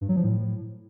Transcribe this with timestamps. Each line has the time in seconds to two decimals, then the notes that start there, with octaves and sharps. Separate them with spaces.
0.01 G2
0.09 F#3
0.16 F3
0.24 A2